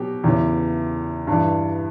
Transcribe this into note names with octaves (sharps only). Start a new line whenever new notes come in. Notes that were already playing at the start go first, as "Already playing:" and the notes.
Already playing: B2 F#3 G4
E2 C#3 E3
G2
E3